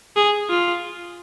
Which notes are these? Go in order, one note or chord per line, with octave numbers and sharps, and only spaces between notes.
G#4
F4